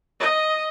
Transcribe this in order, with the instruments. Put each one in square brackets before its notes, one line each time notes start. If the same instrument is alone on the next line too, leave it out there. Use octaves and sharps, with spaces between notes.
[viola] D#5